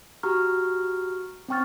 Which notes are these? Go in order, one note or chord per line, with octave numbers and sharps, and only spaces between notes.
F#4 G4 A#5 C#6 F6
C4 C#4 G5 C#6 F6 A6